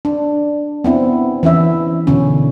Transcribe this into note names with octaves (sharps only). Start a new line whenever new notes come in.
D4
B3 C4 E4
E3 C#4 E4 E5
B2 D3 C#4